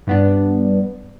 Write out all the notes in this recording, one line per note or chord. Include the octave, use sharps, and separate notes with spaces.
G2 B3 D4